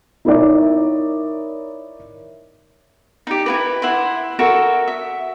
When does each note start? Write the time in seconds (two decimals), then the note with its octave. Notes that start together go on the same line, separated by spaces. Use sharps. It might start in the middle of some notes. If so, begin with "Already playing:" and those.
0.25 D#4 E4 A#4 C#5 D5 E5
3.27 D#4 G4
3.46 E4 F#4 B4
3.82 E4 E5 F#5 C6
4.39 F#4 A4 A#4 E5
4.88 E5